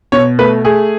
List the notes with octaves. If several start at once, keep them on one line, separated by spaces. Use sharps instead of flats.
B2 C#5
A3 B4
A3 G#4